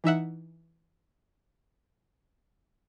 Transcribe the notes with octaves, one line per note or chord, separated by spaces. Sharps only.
E3 D#4 E5 F#5